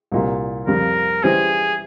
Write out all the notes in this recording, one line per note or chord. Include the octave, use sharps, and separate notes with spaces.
C2 A#2 G3
F2 C#3 G3 A#4
E3 G3 C#4 G4 G#4 C5